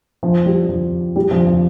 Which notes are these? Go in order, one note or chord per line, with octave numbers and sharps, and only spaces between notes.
F3
G3
F3
G3
F3
F3